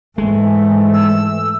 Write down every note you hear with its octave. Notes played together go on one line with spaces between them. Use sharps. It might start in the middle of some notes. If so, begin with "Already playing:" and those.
G#2 E3 G#3 A3
E6